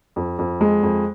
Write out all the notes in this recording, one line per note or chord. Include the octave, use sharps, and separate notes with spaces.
F2
F2
G#3
F2